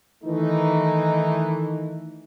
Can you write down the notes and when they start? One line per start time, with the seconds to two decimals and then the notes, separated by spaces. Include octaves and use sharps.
0.24 D#3 E3 A3 D#4